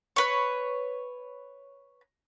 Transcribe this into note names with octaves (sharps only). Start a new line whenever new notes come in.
B4 C#5